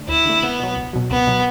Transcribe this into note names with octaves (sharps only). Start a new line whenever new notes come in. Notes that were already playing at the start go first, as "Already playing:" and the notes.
Already playing: D3 A3
D2 E4
D3 A3
C#2 B3
B2 F#3
C#2
B2 F#3
C#2 B3
B2 F#3